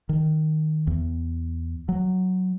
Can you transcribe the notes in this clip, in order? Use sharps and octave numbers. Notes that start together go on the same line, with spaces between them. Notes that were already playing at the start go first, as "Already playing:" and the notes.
D#3
E2
F#3